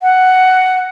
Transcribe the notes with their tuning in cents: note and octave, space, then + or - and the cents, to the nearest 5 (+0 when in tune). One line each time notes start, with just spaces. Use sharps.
F#5 +5